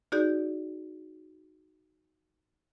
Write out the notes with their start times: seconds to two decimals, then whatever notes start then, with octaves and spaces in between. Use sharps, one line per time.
0.12 D#4 F#4 G#4 D5 G6